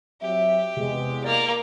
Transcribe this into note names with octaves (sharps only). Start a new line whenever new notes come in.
F#3 C4 G4 E5
E2 C3 G#3
A#3 D5 D6